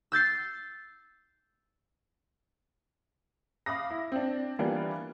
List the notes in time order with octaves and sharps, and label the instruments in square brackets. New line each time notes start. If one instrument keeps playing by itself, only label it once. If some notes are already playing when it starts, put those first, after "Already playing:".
[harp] E6 G6 A6 C7
[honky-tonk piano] F5 B5 D6 D#6 A#6
E4
C4 D4
E3 G3 A#3 B3 D4 F4